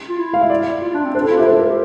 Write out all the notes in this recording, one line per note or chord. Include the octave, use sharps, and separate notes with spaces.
F4
E4
F5
E5
D5
F4
D4
C4
D4 C5
A4
E4
F4
G4
E5
A4 C5
A#4
G4